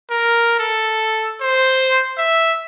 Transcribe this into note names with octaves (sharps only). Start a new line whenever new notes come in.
A#4
A4
C5
E5